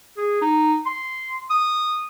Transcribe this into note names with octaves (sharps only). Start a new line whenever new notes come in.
G#4
D#4
C6
D#6